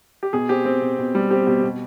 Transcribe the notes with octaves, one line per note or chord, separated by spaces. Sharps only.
G4
B2 G#4
C4 G4
C4
B2
B2
G3
C4 G4
B2 G4
B2